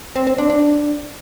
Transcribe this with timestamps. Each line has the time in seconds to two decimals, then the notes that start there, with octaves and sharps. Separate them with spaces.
0.16 C4
0.27 C4
0.38 D4
0.50 D4